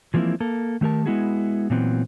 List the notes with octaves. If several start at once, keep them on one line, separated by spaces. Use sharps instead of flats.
E3 F3 G#3 A#3 C4 E4
A#3 A4
D#3 A3 G4 A#4 A5
G#3 B3 E4 F#4 G#4
A#2 E3 F#3 B3 C4